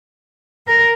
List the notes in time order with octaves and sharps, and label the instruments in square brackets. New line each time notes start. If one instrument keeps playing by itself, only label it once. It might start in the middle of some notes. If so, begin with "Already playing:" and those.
[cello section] A#4